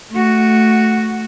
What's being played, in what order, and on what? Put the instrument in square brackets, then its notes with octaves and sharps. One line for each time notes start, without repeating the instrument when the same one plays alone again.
[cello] A3 F#4